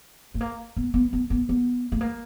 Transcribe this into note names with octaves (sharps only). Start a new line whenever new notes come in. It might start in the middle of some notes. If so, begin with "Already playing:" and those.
A3
A#3
B3
B3
B3
B3
B3
A3
A#3